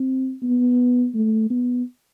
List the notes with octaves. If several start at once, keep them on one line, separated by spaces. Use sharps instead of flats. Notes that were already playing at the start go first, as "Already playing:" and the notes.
Already playing: C4
B3
A3
B3